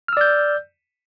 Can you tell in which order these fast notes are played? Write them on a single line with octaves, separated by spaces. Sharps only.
F6 E6 D5 G6